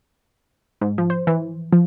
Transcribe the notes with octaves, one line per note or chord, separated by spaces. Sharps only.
G#2
F3
C5
E3
F3